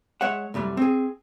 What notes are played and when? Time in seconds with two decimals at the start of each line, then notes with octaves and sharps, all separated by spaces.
0.21 G#3 C#5 E5 F#5
0.54 C2 F#2 G3 A3
0.77 C4 G#4